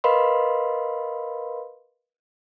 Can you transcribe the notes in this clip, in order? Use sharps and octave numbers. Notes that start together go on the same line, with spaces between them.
A#4 B4 D#5 F5 B5 C6